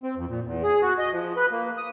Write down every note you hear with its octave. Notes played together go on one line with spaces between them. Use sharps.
C4
F2
A#2
E2
G#4
F#4
D#5
F3
B4
A#3
D#6